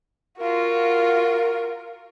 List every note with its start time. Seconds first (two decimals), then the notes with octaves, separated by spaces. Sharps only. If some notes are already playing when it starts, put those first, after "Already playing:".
0.39 F4 F#4 A#4